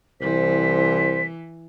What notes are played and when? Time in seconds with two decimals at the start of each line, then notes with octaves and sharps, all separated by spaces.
0.21 C2 E3 C5 B6